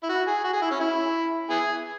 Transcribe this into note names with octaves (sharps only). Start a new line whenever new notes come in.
E4
F#4
G#4
F#4
G#4
E4
C#4
E4
B3 E4 G#4